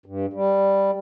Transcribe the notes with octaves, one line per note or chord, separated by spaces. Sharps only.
G2
G3